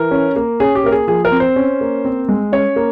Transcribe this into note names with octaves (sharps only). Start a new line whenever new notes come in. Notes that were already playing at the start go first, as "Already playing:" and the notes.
Already playing: E3 A#4
C#4
A#3
C#4 G#4
G4
A#3 A#4
G#4
F3 G#4
A#4
C4
C5
C#4
A#3
C4
G#3
C#4 C#5
A#3